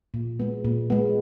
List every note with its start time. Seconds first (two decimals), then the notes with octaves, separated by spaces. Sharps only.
0.14 A#2
0.40 G#3 B3
0.64 A#2
0.90 G#3 B3